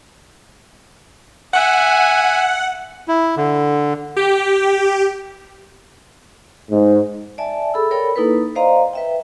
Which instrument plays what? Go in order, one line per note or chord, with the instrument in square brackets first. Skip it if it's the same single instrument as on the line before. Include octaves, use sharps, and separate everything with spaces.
[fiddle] E5 G#5 [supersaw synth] F#5
[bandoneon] E4
D3
[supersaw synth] G4
[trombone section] G#2
[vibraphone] D5 E5 G#5 A5
G#4 A4 B5 E6
A4 A#4 C#5 D5 G5 B5
A#3 D#4 E4 A4 B4
C5 D5 D#5 F5 A#5 C6
B4 E5 G5